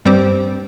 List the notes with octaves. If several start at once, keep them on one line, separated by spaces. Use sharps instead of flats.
G2 G3 C4 G4 C5